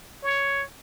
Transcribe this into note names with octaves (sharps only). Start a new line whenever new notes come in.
C#5